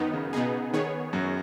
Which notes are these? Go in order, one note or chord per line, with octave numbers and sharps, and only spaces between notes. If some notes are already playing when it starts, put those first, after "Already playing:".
Already playing: F#2 D#3 B3 D#4
C#3
B2 B3 D#4 G#4
D#3 B3 G#4 C#5
F#2 F#3